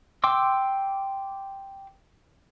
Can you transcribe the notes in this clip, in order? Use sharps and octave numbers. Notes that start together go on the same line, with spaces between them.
G5 C6 D6 E6